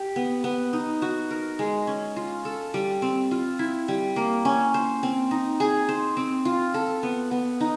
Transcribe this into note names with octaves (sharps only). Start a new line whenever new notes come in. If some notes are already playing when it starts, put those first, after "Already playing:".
Already playing: G4
B3
B3
D#4
F#4
A#4
G#3
C#4
F4
A4
G3
C4
F4
E4
G3
A#3
C#4
C5
C4
D#4
G#4
C5
C4
F4
A4
B3
B3
D#4